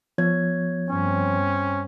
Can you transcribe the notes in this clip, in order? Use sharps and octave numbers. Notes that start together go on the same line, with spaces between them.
F3 B3 C#5 G#6
G2 C4 C#4